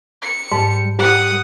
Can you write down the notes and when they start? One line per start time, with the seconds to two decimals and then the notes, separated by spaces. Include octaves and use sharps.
0.22 C#7
0.52 G#2 G3 A5
0.99 G3 G4 F#5 D#6